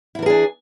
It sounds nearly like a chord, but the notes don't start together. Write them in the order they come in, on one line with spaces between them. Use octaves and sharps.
E4 E3 A#4 G#4 D4